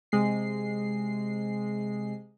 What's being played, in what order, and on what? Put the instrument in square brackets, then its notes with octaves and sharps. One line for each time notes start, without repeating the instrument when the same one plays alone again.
[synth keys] C3 G#3 C7